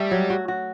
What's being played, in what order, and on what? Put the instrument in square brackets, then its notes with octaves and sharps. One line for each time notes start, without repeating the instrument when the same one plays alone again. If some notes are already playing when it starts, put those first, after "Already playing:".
Already playing: [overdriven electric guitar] G3 [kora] A3
[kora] F#3
F#4
F#4